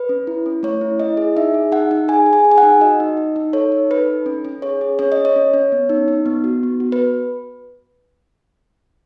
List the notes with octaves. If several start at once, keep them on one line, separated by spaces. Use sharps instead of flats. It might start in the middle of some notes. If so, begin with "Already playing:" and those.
Already playing: B4
C#4
E4
C#4
A3 C#5
E4
E4 D#5
G#4
D#4 E5
G#4
D#4 F#5
D#4
G#4 G#5
G#4
G#5
G#4
G#5
F#5
D#4
F#4 D#5
D#4
D#4
D#4
A4 C#5
D#4
A4 B4
D#4
C#4
C#4
G#4 C#5
G#4
C#4 C#5
D#5
C#4
C#5
C#4
C#4
B3
D#4
D#4
B3
F#4
B3
F#4
B4